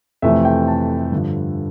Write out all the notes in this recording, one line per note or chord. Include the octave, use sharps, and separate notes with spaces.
F2 C3 E3 A3 E5
G5
A5
G2 D3 F3